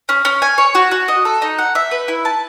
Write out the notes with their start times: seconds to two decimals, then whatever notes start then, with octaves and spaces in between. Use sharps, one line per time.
0.09 C#4
0.25 C#4
0.42 G#5
0.58 C#5
0.75 F#4
0.91 F#4
1.08 D#5
1.25 A4
1.42 D#4
1.58 F#5
1.75 E5
1.91 B4
2.08 E4
2.25 A5